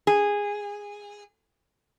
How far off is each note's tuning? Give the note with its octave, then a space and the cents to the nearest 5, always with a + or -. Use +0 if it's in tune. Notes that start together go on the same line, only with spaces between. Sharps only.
G#4 -15